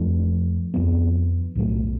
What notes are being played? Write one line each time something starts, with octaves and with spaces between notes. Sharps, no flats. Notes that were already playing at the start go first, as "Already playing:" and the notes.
Already playing: F2 F3 A3 D4
F2 F3 B3 D4
B1 A2 F#3 A3